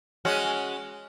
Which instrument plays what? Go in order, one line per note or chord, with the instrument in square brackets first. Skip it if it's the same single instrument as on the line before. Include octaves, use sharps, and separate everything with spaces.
[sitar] G#3 C#4 F#4